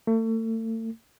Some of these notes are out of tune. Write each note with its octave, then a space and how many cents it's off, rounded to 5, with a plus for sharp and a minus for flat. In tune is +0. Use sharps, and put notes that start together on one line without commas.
A3 +35